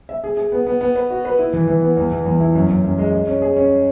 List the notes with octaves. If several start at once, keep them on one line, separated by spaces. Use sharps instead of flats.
E5
G#4
G#4
B3
B3
B3
B4
F#4
B4
E4
E3
E3
B3
E2
E3
E2
E4
F#2
F#2
F#2
G#3
G#3
C#4
G#4
C#4